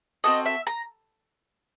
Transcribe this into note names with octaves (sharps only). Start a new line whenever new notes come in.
C4 D#4 F#4 A4 D#5
E5
A#5